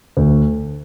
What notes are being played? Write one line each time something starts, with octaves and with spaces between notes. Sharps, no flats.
D2